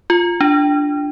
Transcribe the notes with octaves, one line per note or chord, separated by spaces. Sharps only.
F4
D4